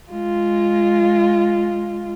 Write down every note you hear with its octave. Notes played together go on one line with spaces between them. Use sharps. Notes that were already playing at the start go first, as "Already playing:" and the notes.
G#3 F4